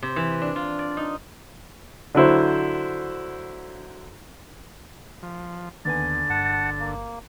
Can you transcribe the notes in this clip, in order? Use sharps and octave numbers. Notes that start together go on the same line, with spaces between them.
C3
E3
D4
F4
D5
D#4
D3 F#3 E4 C5
F3
D#2 D3 B3 G#5 A6
G1 F#5 A5
A#3